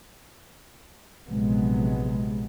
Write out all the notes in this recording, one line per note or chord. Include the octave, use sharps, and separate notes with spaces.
A#1 C3 F#3 G#3 B3